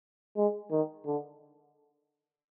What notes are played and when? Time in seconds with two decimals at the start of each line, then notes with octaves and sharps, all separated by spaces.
0.37 G#3
0.71 D#3
1.06 D3